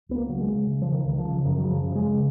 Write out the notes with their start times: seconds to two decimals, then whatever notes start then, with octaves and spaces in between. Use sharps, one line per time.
0.09 C#2 B3
0.16 A#3
0.29 C#3 F#3
0.41 G#3
0.48 C#3
0.67 C#3
0.82 C#3 F3
0.92 D#3
1.05 C#2 D#3
1.18 F3
1.24 C#3
1.45 F#2 D#3
1.58 F#3
1.64 C#3
1.70 F3
1.83 C#3
1.95 G#3
2.02 C#3